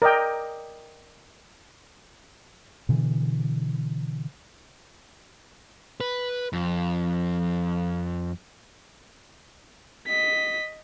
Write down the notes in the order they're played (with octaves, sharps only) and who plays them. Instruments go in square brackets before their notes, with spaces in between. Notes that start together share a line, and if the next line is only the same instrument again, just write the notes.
[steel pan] A#4 D5 D#5 G5
[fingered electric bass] B2 D3 E3
[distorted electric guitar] B4
F2
[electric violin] D#5 B6